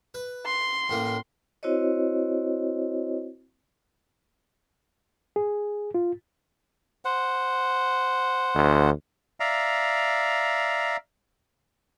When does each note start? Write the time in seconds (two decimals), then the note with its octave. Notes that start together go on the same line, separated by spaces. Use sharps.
0.14 B4
0.46 C6
0.89 A1 A2 A#3
1.63 C4 E4 F#4 C5 C#5 D#5
5.36 G#4
5.95 F4
7.05 C5 F#5
8.55 D2
9.40 D5 E5 F5 A#5